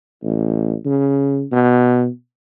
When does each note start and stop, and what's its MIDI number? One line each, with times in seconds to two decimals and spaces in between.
0.23 0.74 33
0.85 1.45 49
1.52 2.08 47